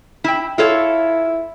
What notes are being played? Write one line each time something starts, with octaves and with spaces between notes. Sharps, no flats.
E4 G5
E4 F4 A4 C#5